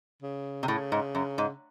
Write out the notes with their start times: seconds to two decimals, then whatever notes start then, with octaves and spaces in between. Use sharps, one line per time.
0.22 C#3
0.63 C3
0.68 A2 C#3
0.92 G#2
1.15 F#2
1.38 G#2